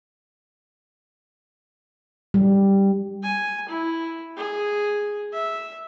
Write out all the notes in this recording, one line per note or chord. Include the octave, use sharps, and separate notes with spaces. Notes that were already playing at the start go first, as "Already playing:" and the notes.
G3
G#5
E4
G#4
E5